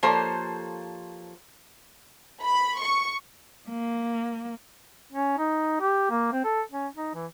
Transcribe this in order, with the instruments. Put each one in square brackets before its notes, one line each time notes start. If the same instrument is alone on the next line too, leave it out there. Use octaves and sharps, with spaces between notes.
[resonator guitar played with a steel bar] F3 A#3 G4 A4 C5 C#5
[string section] B5
C#6
[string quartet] A#3
[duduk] C#4
D#4
G4
A#3
C4
A4
C#4
D#4
E3